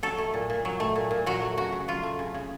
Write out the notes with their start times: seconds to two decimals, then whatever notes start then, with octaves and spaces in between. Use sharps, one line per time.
0.03 F#3 A4
0.18 A3
0.34 A#2
0.50 A#2
0.65 F#3
0.80 A3
0.96 A#2
1.11 A#2
1.26 F#3 F#4
1.42 A3
1.57 C#3 F#4
1.72 C#3
1.88 F#3 F4
2.03 A3
2.19 C#3
2.34 C#3